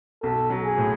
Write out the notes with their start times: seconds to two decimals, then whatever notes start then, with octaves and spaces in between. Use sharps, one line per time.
0.23 B1 A4
0.50 F#3
0.64 G#4
0.78 A2